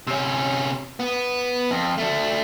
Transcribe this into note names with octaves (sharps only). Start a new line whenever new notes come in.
C3 C#4
B3
F2
A3 D4